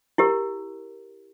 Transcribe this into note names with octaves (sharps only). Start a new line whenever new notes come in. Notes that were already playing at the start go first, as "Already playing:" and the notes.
E4 G4 A#4